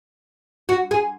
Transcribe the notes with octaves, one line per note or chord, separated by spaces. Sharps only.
F#4
G#4